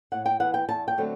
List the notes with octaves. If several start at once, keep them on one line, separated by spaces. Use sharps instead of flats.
A2 F#5
G5
E3 B3 F#5
G5
E2 A5
G5
D3 F#3 A3 C4